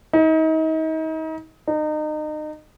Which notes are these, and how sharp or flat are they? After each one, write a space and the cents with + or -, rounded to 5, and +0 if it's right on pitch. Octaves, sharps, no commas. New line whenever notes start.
D#4 +35
D#4 -30